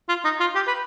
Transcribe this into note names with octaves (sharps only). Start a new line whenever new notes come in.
F4
D#4
F4
G4
B4